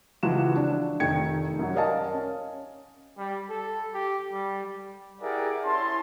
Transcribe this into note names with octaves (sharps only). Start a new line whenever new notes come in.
C#2 E3 F3 F4 F#4 E7
D4
F1 D#3 A3 G5 G#6 C#7
F#2 F#3
A#4 D5 D#5 F5 G#5 A5
C#4
G3
A4
G4
G3
E4 G4 G#4 A#4 D5 F#5
C#4 E4 A5 C6